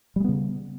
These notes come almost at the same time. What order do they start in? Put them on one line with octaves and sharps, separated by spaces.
G3 G#3 B3 C#3